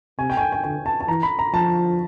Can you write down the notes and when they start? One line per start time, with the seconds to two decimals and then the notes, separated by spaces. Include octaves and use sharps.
0.19 C3 G#5
0.30 G5
0.37 G#5
0.41 G5
0.52 G5
0.64 D3 G5
0.86 A5
1.01 A5
1.08 E3 A#5
1.23 B5
1.39 A#5
1.53 F3 A5